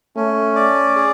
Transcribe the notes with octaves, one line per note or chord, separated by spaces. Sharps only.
A3 C#4
D5
G#4